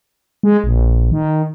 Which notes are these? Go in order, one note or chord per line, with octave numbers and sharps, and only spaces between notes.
G#3
A#1
D#3